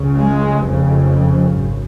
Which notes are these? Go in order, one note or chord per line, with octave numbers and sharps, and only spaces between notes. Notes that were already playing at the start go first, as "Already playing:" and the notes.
Already playing: C#2 C#3
G#3
F1 F2 C#3
G#1 F#2